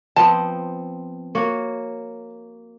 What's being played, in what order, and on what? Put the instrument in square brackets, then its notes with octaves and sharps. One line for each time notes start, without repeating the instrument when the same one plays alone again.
[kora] F3 B3 C4 [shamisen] A5
[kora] A#3 F#4 C#5